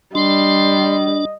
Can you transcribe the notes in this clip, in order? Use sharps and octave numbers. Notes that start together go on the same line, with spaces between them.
G3 D4 D#5 C6